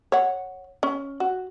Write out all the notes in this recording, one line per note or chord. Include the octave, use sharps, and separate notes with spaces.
C#5 F#5
C#4
F#4